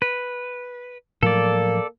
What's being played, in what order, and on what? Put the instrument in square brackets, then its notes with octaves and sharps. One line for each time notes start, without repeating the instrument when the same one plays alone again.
[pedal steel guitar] B4
[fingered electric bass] A2 F3 F#3 [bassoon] A#3 [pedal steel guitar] A4 D5